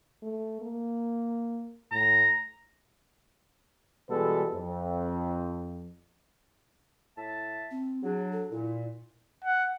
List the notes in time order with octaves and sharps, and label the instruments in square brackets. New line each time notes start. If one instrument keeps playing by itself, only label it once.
[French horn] A3
A#3
[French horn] A2 [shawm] A#5
[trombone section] B2 E3 G3 G#3 A4 B4
F2
[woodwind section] A2 E5 A5
[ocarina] C4
[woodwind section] F#3 D4 [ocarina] G#4
[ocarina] A4
[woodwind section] A#2 [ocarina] E4
[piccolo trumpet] F#5